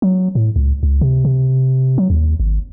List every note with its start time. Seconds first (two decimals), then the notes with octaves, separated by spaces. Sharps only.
0.02 F#3
0.35 A2
0.56 C#2
0.83 C#2
1.01 C3
1.25 C3
1.98 F#3
2.10 D#2
2.40 G#1